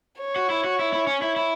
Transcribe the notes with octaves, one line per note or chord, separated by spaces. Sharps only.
C#5
F#4
E4
F#4
E4
E4
C#4
E4
E4